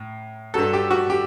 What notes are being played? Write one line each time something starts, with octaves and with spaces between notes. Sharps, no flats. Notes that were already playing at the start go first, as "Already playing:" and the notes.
Already playing: A2
G2 F#3 A4
G4
F#4
G4